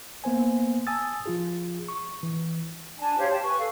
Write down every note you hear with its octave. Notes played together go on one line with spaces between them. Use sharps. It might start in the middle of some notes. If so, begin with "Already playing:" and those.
A#3 B3 C5 G#5
G#5 A5 D#6 E6 A6
F3 F4 G#4
C#6
E3
D4 G#5 A5
G4 C5 C#5 F5
G4 A5
B4 G#5 C#6
A4 F5